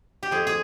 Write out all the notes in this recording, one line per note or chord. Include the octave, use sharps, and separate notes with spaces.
G4
F2 G#4
G#4